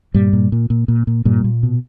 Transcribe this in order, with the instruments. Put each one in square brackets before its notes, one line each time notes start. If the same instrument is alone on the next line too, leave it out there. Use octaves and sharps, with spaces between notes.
[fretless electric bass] G2 A#2 G3
A#2
A#2
A#2
A#2
A#2
G2 A#2 G3
A#2
B2